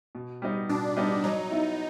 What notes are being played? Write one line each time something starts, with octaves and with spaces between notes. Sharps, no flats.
B2
G3 B3 D#4
B2 D4
G3 B3 D#4
F#3 D#4
B3 E4